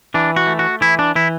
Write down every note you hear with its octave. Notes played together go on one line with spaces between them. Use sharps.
E3 D4
F#4
A3
F#4
E3 E4
D4
E3 E4